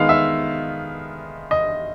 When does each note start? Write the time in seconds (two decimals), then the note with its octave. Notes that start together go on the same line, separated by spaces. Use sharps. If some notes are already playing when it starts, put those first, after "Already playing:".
Already playing: D#3 G#3 B3 F5
0.09 E5
1.51 D#5